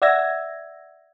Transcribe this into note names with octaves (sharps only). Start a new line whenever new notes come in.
D5 E5 F#5 E6 G#6 A#6